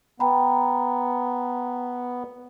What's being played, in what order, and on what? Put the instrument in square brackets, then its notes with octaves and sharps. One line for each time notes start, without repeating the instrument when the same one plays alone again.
[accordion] B3 [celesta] G5 A#5 B5